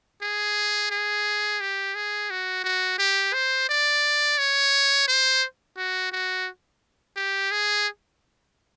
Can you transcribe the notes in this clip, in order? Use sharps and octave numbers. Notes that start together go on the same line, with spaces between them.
G#4
G#4
G4
G#4
F#4
F#4
G4
C5
D5
C#5
C5
F#4
F#4
G4
G#4